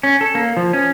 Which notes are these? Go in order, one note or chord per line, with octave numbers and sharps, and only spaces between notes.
C#4
A4
A#3
F3
C#4